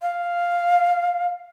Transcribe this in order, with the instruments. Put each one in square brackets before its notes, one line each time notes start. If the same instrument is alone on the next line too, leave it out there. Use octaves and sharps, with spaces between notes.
[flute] F5